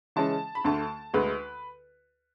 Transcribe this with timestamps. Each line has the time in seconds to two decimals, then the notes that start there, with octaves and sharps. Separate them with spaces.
0.16 C#3 E3 G#3 C#4 A5
0.55 B5
0.64 D2 D3 A3 A5
1.13 D2 D3 G#3 B4